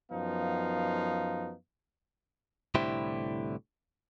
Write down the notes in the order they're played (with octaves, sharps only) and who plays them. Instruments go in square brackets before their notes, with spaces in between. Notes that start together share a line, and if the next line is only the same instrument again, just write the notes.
[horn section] F#2 F3 B3 D#4 F5
[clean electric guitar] C2 A2 D3 E4 G4 C5